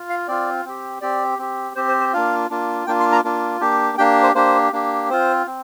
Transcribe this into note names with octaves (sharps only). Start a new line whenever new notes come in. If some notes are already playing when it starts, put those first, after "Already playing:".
Already playing: F4
F5
C4 F4 D5
C4 G4
C4 G4 D5
C4 G4
C4 G4 C5
C5
C5
A#3 D4 F4 F5
A#3 D4 F4
A#3 D4 F4 G5
C6
A#5
A#3 D4 F4
A#3 D4 G4
A#3 D4 G4 G5
C5
A#3 D4 G4 C5
A#3 D4 G4
C4 F4 C5
C4